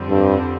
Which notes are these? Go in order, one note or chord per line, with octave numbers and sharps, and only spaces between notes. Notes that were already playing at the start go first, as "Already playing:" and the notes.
Already playing: F2 D3 G3 C4
G2